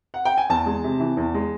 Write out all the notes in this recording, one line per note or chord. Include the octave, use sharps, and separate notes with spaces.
F#5
G5
G#5
E2 A5
G#3
C3
E3
E2
G#3